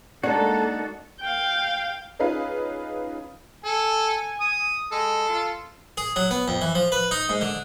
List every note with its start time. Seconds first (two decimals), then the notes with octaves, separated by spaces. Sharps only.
0.23 G#3 A#3 D4 D#4 F#4 A4
1.20 F5 G5
2.19 C#4 D#4 F4 G#4 B4 F5
3.64 A4 G#5
4.40 D#6
4.92 G#3 A4
5.29 F4
5.97 G#4
6.16 F#3
6.31 B3
6.48 F2
6.61 E3
6.75 F3
6.92 B4
7.11 D#4
7.29 G#2
7.41 D3